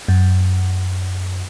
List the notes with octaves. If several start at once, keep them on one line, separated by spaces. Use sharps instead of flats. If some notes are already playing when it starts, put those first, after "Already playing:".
F#2